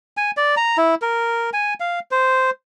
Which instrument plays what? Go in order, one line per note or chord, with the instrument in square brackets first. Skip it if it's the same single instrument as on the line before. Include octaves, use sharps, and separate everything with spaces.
[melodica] G#5
D5
A#5
E4
A#4
G#5
F5
C5